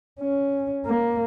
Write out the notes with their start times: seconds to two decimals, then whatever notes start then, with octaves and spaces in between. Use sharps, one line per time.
0.20 C#4
0.85 A#3